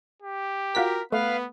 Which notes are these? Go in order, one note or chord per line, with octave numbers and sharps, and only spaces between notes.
G4
F4 F#4 A#4 B6
A3 B3 B4 F5